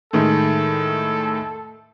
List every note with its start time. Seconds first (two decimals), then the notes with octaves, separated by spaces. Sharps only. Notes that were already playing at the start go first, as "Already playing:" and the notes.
0.13 A2 D#3 G#3 A4